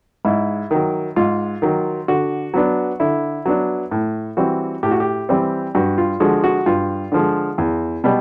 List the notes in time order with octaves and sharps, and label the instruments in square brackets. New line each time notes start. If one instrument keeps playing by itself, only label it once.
[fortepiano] G#2 E4
D#3 F#3
G#2 F4
D#3 F#3
D3 F#4
F#3 B3 D4
D3 E4
F#3 B3 D4
A2
E3 G3 C4 F#4
A2 G4
F#4
G4
E3 G3 C4
G2 F#4
F4
D3 F3 G#3 F#4
F#4
G2 F4
D3 F3 G#3
E2
B2 G3